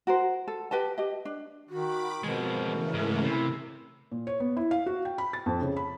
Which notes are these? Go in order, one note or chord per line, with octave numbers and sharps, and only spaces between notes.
F#4 A#4 C5
A4
G4 B4 D#5 A5
G4 D#5
D4
D#3 F#4 B5 D6
B2 F3 G#3 C4 A#4
C#3 E3 A3
G#2
C3 E4
A#2
C#5
B3
E4
F5
F#4
G5
B5
A6
F2
C#3
B5